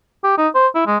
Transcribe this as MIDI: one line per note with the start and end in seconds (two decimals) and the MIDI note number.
0.24 0.36 67
0.38 0.48 63
0.55 0.67 72
0.75 0.85 64
0.87 0.97 56